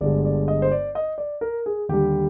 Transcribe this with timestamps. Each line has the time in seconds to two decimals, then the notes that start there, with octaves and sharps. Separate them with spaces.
0.01 G1 G2 D3 G#3 D5
0.25 D5
0.48 D#5
0.62 C5
0.72 D5
0.95 D#5
1.18 D5
1.41 A#4
1.66 G#4
1.89 D#2 D3 G3 G4